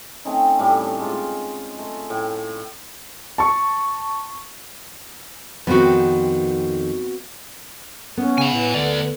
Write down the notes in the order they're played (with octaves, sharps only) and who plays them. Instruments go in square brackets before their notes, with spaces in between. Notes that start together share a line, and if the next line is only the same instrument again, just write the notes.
[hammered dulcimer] A3 C4 C#4 D#4
A2 G3 A3
G#3 F4
A3
A2
[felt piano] A5 C#6
[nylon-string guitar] F2 D#3 [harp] B3 C4 F#4
[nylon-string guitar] B3 [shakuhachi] C#4
[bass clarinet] C#3 [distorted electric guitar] G#5 B5
[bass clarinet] A2 [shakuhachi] B4
[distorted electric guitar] D2 D5 [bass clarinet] D3